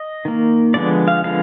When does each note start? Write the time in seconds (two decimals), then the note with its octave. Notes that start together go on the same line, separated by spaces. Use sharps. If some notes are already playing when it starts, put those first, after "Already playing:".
Already playing: D#5
0.25 D#3 A#3
0.74 D3 F3 G#3 B3 D5
1.08 F5
1.24 D3 F3 G#3 B3 F5